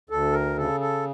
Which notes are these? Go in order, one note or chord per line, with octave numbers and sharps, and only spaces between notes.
D2 A4
A#4
C#3 A4
A4